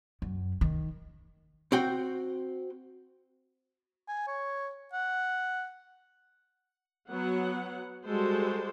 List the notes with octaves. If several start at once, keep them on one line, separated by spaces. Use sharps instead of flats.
F#2
D#3
C4 F#4 G5
G#5
C#5
F#5
F#3 B3 F#5
G3 G#3 F#4 A4 C5